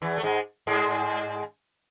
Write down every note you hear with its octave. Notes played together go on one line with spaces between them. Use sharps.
E2 E3
A3
G#2 G#3
G#2 G#3